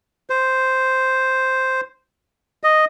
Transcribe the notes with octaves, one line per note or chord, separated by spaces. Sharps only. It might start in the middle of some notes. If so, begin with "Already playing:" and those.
C5
D#5